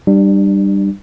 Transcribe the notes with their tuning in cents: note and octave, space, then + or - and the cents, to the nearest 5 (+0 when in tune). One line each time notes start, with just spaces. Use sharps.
G3 +0 D4 +30